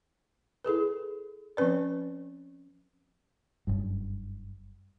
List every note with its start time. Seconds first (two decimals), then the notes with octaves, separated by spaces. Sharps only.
0.64 E4 G#4 A4 B4
1.57 F3 C4 C#4 B4 D5
3.67 F#1 G2